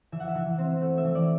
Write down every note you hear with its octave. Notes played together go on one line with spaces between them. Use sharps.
E3 E5
F#5
E5
E3
C4
A3
E5
E3
D5